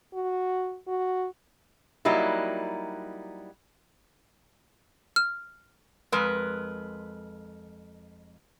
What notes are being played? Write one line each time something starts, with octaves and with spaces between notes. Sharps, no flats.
F#4
F#4
F#3 G3 A#3 D#4 E4
F6
F2 G#3 A#4 B4